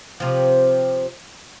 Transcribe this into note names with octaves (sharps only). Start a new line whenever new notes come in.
C3 F3